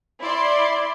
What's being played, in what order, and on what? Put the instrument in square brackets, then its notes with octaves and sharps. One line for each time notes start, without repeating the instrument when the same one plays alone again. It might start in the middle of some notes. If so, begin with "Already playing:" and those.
[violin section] E4 D5 C6